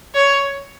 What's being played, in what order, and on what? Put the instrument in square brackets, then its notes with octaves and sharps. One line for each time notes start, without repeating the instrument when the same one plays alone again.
[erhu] C#5